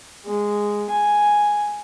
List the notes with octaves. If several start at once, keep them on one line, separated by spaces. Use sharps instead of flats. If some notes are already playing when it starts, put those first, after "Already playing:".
G#3
G#5